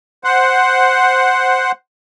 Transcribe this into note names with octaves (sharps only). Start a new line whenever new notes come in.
C5 F#5